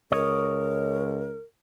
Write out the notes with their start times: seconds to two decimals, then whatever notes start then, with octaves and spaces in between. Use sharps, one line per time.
0.12 C#2 A#4 C#5 D#5